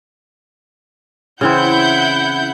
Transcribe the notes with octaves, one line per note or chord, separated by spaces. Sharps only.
C#3 E3 C4 E4 F#5 G6